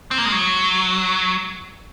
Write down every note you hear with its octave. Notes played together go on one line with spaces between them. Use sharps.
C4
A#3
G#3
F#3